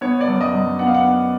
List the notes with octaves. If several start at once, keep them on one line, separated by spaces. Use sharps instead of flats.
B3 C#5
D5
F#2
D#5
F#2
B3 F#5
F5
F#5
B3